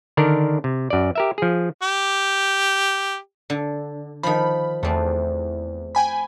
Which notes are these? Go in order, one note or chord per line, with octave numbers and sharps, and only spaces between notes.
D3 D#3 D4 A#4
C3
F#2 D5
G4 A#4 E5
F3 G#4
G4
D3
D#3 F3 B5
E2 A3 C4
G5 G#5 B5